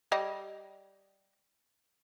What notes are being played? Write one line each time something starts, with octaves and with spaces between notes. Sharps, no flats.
G3 D#5